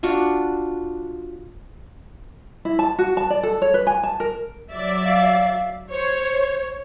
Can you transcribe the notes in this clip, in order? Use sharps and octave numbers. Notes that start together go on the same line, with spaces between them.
D4 F4 F#4
E4
A5
F#4
A5
D5
A4
C#5
B4
G#5
A5
A#4
F#3 D5 E5
F5
C5 C#5